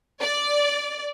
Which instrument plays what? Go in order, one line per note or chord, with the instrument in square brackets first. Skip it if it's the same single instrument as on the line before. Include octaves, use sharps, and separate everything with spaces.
[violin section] D5